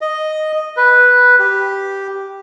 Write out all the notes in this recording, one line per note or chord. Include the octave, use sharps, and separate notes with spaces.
D#5
B4
G4